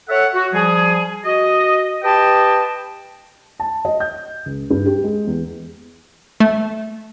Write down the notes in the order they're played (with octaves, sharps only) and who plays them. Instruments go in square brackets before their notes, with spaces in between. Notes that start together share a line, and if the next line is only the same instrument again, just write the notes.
[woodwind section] A4 C#5 E5 F#5
F#4
F3 G3 G#4
F#4 D#5
G4 B4 D#5 G5 A5
[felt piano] A5
D#5
G6
C#2
G2
G4
G#3
E2
[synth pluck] A3